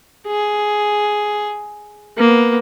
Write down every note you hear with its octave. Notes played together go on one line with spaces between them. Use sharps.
G#4
A#3 B3